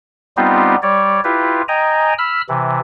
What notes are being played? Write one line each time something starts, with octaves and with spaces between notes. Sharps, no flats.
G3 B3 C4 D#4 F4 G4
G3 C#5 D5
E4 F4 G4 B4
D#5 G5 G#5 A#5
B5 E6 F6
C3 E3